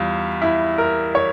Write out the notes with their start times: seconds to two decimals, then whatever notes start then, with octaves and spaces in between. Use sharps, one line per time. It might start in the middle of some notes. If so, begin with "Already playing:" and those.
Already playing: E2 G3 F4
0.42 E4
0.78 A#4
1.15 C#5